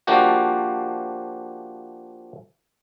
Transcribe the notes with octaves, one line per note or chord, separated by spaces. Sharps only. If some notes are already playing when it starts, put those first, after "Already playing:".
F3 A#3 D4 F#4 G4